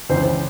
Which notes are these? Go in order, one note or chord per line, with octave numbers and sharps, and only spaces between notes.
C#2 C#3 E3 C5